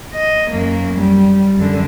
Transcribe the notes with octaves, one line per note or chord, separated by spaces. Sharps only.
D#5
F#2 A#3
G3
F#2 D3